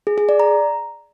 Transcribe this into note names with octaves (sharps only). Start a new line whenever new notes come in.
G#4
G#4
D5
A#5